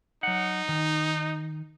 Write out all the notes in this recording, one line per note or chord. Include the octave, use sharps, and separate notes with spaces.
F#3 D#4 F#5
D#3